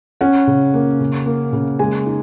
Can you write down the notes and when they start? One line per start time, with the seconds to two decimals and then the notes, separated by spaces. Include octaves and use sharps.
0.21 C#4 F#5
0.47 C#3
0.74 A#3
1.00 C#3
1.26 A#3
1.53 C#3
1.79 G#3 G#5
2.06 D#4